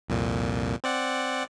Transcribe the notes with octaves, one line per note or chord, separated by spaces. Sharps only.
C2 F2 A#2
C4 D5 F#5